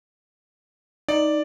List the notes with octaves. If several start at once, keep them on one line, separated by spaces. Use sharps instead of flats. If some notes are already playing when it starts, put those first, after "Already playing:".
D#4 D5